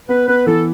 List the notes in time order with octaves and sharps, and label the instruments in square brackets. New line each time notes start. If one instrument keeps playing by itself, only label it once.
[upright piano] B3 [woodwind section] B4
[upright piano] B3 [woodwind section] B4
[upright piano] E3 [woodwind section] A4